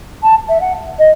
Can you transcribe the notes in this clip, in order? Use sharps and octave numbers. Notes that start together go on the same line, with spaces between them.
A5
E5
F#5
D#5